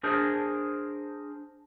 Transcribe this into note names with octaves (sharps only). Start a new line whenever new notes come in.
D4 G#4 A#4 C5